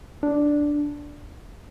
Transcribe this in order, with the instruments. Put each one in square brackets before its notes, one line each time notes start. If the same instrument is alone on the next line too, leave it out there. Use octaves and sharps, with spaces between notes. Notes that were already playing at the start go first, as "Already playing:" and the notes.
[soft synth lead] D4